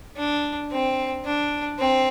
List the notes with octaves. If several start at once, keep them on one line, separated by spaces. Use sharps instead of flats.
D4
C4
D4
C4